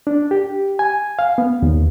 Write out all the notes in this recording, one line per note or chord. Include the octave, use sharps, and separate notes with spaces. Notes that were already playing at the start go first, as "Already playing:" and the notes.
D4
G4
G#5
F5
B3
D#2